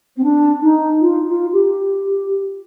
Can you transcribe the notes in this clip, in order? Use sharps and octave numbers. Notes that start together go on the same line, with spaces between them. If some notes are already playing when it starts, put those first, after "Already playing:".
C4
D4
D#4
F4
F4
G4